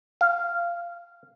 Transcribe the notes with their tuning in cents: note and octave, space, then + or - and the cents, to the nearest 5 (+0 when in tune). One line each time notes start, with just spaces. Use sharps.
F5 -15